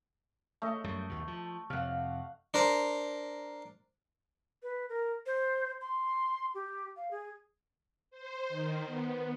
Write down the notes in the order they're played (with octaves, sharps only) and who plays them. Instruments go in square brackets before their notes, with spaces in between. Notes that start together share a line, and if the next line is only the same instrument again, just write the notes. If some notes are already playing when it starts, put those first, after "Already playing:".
[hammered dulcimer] A3 D#5
[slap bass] F#2 G3
D#2 B2
F3
[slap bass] F2 C3 [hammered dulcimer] F5 F#5
[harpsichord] D4 A#4 C5 A#5
[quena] B4
A#4
C5
C6
G4
F5
G#4
[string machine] C5
D#3
B3